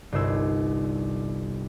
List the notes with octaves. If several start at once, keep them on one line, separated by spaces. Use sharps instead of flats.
G1 C2 D#4 C5 E6 G#6